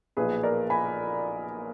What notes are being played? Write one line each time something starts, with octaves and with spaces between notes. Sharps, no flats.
B1 A#2 F3 G#4 B4
A#4 D5
G#5 B5